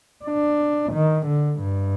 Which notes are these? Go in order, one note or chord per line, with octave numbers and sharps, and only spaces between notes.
D4
D#3
D3
G2